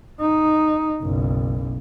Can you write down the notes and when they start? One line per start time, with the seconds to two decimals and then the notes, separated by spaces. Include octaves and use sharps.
0.21 D#4
1.02 F#1 B1